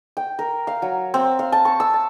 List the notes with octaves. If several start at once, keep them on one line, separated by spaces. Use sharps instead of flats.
G5
A#4
F5
F#3
C4
F5
A5
C#6
E6
A5